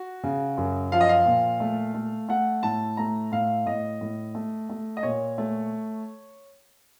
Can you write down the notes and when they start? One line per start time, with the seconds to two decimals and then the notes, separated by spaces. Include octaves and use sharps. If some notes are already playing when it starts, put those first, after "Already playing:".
Already playing: F#4
0.24 C#3
0.57 F#2
0.92 F3 F5
1.01 D#5
1.09 F5
1.26 A#2
1.60 A3
1.94 A3
2.29 A3 F#5
2.63 A2 A5
2.97 A3 A#5
3.32 A2 F5
3.66 A2 D#5
4.01 A2
4.35 A3
4.69 A3
4.97 D#5
5.03 A#2 C#5
5.38 A3